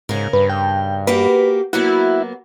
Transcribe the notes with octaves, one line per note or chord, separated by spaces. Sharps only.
G#2 C#3 A#4
G2 B4
G5
A#3 F#4 G4 B4
F#3 A#3 B3 E4 F#4